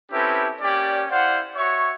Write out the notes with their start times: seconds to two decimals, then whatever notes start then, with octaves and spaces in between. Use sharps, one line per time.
0.12 C4 C#4 E4 G4 A4 B4
0.61 A#3 C#4 G4 D5
1.10 E4 C5 D5 F5 F#5
1.56 F#4 C#5 E5 C#6